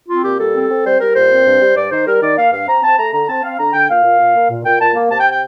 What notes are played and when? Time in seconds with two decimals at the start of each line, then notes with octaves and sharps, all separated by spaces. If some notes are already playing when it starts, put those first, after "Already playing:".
0.08 C4 F4
0.23 A#2 G4
0.38 G3 A4
0.54 C4
0.69 C4
0.84 G3 C5
1.00 G3 A#4
1.14 A#2 C5
1.30 C4
1.45 G2
1.60 G3
1.76 G2 D5
1.90 D#3 C5
2.06 G3 A#4
2.21 D#3 D5
2.37 A#3 F5
2.52 G2 F5
2.67 C4 A#5
2.82 C4 A5
2.97 A3 A#5
3.12 D3 A#5
3.27 C4 A5
3.43 C4 F5
3.57 D3 A#5
3.73 D3 G5
3.89 A#2 F5
4.03 A#2
4.19 A#2
4.34 A#3
4.49 A#2
4.64 A#2 G5
4.79 A#2 A5
4.95 A#3
5.10 C3 A5
5.20 G5
5.31 G5